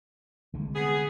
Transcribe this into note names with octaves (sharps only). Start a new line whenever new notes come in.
C2 D3 G#3
B3 G#4